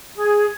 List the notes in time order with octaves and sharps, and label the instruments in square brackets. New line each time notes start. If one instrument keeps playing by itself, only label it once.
[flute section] G#4